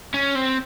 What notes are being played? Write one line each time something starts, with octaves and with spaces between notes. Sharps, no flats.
C#4
C4